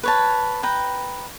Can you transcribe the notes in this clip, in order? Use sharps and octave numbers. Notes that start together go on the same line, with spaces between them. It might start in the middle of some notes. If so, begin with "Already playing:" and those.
B4 C#5 A5
B4 G5 A#5